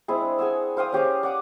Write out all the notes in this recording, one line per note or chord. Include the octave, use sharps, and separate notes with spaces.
G#3 C4 E4 G#4
D4
G#4 F#5 G#5 E6
C5 F5 G5 D#6
C#4 G4 G#4 F5
D5 F#5 D6 D#6